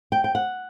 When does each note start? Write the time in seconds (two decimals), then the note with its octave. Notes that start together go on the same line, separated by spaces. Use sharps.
0.12 G5
0.24 G5
0.35 F#5